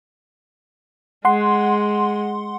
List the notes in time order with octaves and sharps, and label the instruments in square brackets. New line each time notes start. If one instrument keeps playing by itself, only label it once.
[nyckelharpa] G#3 [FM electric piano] F#5 C6